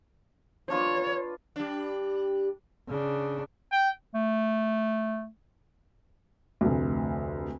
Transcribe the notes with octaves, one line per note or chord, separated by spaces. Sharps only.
D4 F4 B4 C#5
G3 D4
C#3 D4
G5
A3
F1 D2